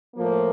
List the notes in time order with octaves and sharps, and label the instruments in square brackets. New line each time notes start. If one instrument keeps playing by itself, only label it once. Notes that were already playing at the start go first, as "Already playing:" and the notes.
[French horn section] A2 F3 A#3